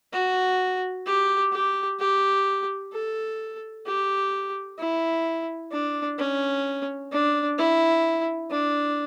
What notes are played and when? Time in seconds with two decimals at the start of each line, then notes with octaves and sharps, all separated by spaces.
0.13 F#4
1.06 G4
1.52 G4
1.99 G4
2.93 A4
3.86 G4
4.79 E4
5.72 D4
6.19 C#4
7.12 D4
7.58 E4
8.51 D4